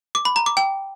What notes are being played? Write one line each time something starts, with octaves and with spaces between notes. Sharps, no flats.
D6
B5
A#5
D6
G5